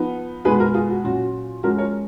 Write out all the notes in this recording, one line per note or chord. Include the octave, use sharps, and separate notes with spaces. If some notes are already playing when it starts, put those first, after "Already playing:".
Already playing: F3 B3 D#4
B2 G#3 B3 D#4 G#4 B4
F#4 A#4
F4 G#4
F#4
A#2 F#3 C#4 F#4
F3 G#3 C#4 F#4 A#4
A#4 C#5